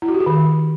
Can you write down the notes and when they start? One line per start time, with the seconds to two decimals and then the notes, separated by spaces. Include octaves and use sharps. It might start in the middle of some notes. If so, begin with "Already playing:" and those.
0.02 E4
0.08 F#4
0.14 G4
0.20 G#4
0.26 D#3